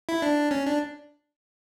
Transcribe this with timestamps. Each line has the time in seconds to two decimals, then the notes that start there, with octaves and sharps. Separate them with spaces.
0.09 E4
0.22 D4
0.51 C#4
0.66 D4